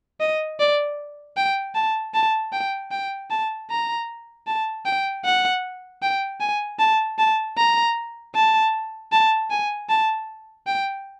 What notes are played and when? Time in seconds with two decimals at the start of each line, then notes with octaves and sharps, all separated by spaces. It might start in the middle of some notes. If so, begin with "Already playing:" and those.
0.20 D#5
0.59 D5
1.37 G5
1.75 A5
2.14 A5
2.53 G5
2.91 G5
3.30 A5
3.70 A#5
4.47 A5
4.85 G5
5.25 F#5
6.02 G5
6.40 G#5
6.79 A5
7.18 A5
7.57 A#5
8.35 A5
9.12 A5
9.50 G#5
9.89 A5
10.67 G5